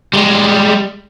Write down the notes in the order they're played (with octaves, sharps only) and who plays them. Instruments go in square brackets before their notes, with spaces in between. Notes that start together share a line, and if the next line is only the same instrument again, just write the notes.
[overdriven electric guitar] G3 G#3